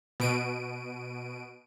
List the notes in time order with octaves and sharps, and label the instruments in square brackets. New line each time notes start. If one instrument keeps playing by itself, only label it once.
[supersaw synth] B2 D7 D#7